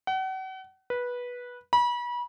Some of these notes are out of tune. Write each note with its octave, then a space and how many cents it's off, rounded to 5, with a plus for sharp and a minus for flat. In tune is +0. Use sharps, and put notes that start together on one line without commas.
F#5 +40
B4 -15
B5 -35